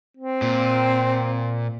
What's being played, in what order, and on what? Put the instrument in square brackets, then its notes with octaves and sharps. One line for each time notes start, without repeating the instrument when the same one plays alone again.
[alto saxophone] C4
[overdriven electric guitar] A#2